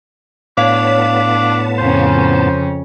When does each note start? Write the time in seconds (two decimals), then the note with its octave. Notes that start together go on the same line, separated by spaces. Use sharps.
0.57 A2 B3 D4 C#5 F5 A5 B6
1.78 F2 C#3 C#4 C5